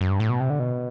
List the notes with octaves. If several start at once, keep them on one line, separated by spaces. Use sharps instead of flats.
F#2
G2
A2
B2
C3
D3
B2